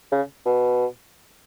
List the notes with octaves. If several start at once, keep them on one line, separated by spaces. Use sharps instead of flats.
C#3
B2